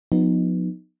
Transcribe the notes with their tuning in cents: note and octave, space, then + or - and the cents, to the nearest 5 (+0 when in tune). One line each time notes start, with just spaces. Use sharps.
F3 +40 B3 +0 D#4 -10